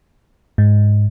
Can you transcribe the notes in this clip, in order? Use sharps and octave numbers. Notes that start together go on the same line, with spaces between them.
G#2